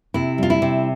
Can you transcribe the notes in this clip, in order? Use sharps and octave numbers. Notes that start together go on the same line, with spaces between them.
C3 E4
G3 F4
E4
C3